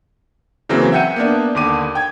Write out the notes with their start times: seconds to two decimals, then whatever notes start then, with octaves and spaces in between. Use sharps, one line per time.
0.69 C#3 E3 F#3 A#3 C4
0.92 E5 F#5 G5 G6 C#7 D#7
1.16 A#3 B3 D4
1.55 D#2 D3 D6 D#7
1.95 G5 G#6